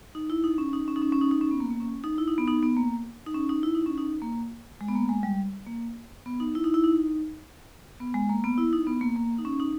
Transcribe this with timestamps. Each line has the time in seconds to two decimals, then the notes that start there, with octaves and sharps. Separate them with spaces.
0.15 D#4
0.30 E4
0.44 D#4
0.58 C#4
0.73 D#4
0.88 C#4
0.96 D#4
1.02 C#4
1.12 C#4
1.21 D#4
1.31 D#4
1.41 C#4
1.51 B3
1.60 A#3
1.71 A#3
1.80 C#4
2.04 D#4
2.18 E4
2.28 D#4
2.38 B3
2.47 D#4
2.63 B3
2.77 A#3
3.27 D#4
3.34 C#4
3.49 D#4
3.63 E4
3.75 D#4
3.86 C#4
3.97 D#4
4.22 A#3
4.81 G#3
4.88 B3
4.95 A#3
5.09 G#3
5.23 G3
5.67 A#3
6.26 B3
6.40 D#4
6.55 E4
6.64 D#4
6.74 E4
6.84 D#4
8.00 B3
8.14 G#3
8.29 A#3
8.44 B3
8.58 E4
8.73 D#4
8.87 B3
9.01 A#3
9.16 A#3
9.39 D#4
9.45 C#4
9.60 D#4